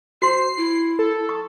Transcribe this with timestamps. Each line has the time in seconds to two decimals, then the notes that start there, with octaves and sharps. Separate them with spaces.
0.22 F#4 C5 C6 C7
0.57 E4
0.99 A4
1.29 C#6 D#6